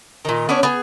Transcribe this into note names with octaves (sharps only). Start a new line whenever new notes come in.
A#2 D#3
B3 C#4 D4 C#5
B3 G#4